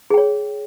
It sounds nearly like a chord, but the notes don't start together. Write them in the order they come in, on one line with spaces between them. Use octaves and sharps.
G#4 G5 C#5